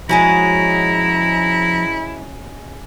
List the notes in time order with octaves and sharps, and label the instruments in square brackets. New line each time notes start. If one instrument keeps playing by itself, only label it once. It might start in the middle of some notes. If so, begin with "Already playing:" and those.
[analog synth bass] F3 [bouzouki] G#3 C#4 F#4 [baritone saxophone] E4 [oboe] A#5